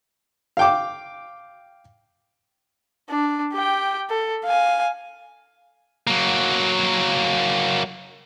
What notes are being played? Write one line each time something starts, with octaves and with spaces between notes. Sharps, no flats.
F5 G5 D6
D4
G4 G5
A4
F5 G#5
F#3 A#3